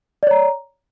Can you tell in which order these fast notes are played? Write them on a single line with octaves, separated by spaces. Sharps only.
D5 C#5 A#5